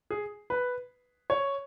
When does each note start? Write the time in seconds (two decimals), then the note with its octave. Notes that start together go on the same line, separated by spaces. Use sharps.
0.10 G#4
0.50 B4
1.30 C#5